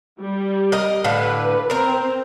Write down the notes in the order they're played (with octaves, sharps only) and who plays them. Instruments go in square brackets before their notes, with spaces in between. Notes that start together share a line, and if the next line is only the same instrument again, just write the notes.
[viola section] G3
[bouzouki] A#4 D#5
[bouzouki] A2 D3 F5 [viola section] B4
[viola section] C4 [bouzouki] A#4 A#5